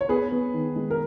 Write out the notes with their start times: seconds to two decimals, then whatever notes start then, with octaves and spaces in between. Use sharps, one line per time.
0.01 C#5
0.09 B3 G#4 B4
0.32 B3
0.53 D#3
0.76 G#3
0.90 A#4